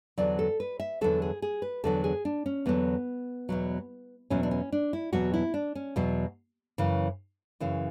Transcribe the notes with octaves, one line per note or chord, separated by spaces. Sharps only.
E2 D3 F#3 D5
A4
B4
E5
E2 D3 F#3 A4
G#4
G#4
B4
E2 D3 F#3 A4
G#4
D4
C#4
E2 D3 F#3 B3
E2 B2 F#3
E2 B2 F#3 C#4
D4
C#4
D4
E4
E2 B2 F#3 F#4
E4
D4
C#4
E2 B2 F#3
F#2 C#3 E3
F#2 C#3 E3